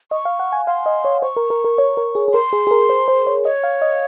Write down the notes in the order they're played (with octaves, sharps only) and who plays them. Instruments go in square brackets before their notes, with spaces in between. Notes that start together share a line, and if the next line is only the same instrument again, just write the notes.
[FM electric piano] D#5 [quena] C#6
[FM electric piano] F5
F#5
G#5
[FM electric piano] F5 [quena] C6
[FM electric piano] D#5
C#5
[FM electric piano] C5 [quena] C#6
[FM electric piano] A#4
A#4
A#4
C#5
A#4
G#4
G#4
[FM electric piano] A#4 [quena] C6
[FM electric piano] G#4
G#4
A#4
C5
C5
C#5
[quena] C#5 [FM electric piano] D#5
[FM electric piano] F5
D#5